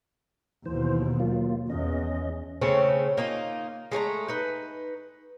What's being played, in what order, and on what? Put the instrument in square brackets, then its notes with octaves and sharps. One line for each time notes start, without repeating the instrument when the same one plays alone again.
[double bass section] D#2 B2 [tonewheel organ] E3 C5
[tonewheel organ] F#3 A#3 F4
[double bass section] E2 [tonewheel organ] C#4 D#5
[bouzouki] C#3 A3 C4 C#4
A#3 D#4 F4
G#3 A3 C#5 A#5
D#4 B4